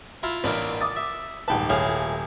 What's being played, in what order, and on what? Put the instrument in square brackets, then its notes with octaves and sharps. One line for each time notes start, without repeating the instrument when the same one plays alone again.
[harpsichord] E4 F4 A#5
[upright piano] A1 [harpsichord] A#3 D4 B4
[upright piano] D6 D#6 A6
[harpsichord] E5
[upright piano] D#1 G#2 A5 [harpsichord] B4 G5
[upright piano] D#1 [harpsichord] A2 G#4 F5